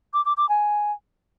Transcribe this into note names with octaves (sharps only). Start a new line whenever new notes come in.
D6
D6
D6
G#5